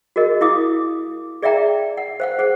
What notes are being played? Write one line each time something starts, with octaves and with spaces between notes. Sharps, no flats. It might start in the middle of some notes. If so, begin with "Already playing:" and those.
F#4 G#4 A#4 D#5
E4 F5 D6 D#6
G#4 D5 E5 F5 G5 A#5
F#5
C5 F5 F#5
G#4 C5 F#5